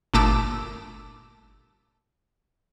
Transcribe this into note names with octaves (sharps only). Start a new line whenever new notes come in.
G1 A#2 A3 A5 D6 E6